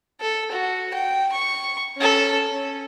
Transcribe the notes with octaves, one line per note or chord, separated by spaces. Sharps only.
A4
F#4
G5
C#6
C#4 A4
C#4